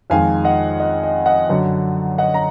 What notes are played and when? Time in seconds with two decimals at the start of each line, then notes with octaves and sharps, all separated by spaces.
0.10 F2 D#3 G#3 F5 G#5
0.44 D#5 F#5
0.80 D#5
1.03 D#5
1.26 D#5 F#5
1.49 F#2 D3 F#3
2.18 D#5 F#5
2.34 A#5